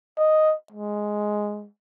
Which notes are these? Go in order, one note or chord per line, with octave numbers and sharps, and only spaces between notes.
D#5
G#3